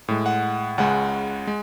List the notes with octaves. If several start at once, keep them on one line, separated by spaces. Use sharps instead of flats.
A2 G#3
F#5
C#2 C#3 G#3 F#5
G#3